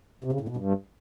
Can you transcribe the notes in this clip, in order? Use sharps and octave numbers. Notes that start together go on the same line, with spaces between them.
C3
C#3
A2
B2
G2